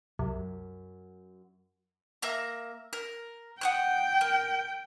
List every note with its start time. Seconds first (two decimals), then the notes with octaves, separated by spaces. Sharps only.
0.19 C2 F#2
2.22 A#3 E5 A#5
2.93 A#4
3.61 F#5 G5 D#6 F#6
4.21 A#4